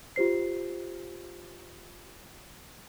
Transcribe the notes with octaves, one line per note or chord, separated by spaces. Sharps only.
F4 G4 C5 C7